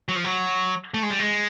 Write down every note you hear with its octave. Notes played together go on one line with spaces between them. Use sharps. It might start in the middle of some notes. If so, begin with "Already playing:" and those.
F#3
F3
F#3
A3
G#3
G3
G#3